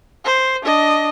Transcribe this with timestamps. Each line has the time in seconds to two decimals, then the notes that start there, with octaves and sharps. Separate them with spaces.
0.25 C5
0.63 D4 D#5